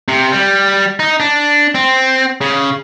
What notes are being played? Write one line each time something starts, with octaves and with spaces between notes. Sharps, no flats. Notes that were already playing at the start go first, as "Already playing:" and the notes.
C3
G3
D#4
D4
C4
C#3